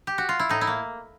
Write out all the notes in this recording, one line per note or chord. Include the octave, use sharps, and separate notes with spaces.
G4
F#4
F4
E4
A2 D#4
E4
A#3